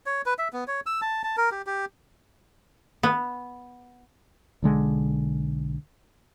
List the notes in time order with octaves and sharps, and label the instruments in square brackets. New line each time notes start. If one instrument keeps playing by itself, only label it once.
[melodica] C#5
B4
E5
B3
C#5
E6
A5
A5
A#4
G4
G4
[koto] B3
[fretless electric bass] B1 D3 G#3